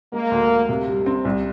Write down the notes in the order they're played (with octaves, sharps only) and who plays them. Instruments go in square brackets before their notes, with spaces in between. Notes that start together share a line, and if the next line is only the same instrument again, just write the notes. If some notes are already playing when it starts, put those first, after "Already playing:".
[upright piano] G#3 [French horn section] A#3
[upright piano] D2
D2
C3
G3
C4
C2